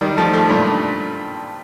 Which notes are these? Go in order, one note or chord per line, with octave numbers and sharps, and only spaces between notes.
D#3 G3
F3 A3
F3 A3
G2 A#2